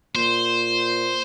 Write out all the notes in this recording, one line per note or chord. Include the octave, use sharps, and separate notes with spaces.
A#2 C5